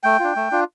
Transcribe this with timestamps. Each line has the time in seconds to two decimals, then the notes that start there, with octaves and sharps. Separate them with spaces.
0.03 A3 G5
0.19 D4 F4
0.36 A3
0.51 D4 F4